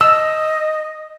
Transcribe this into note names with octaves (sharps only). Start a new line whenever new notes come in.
D#5 E6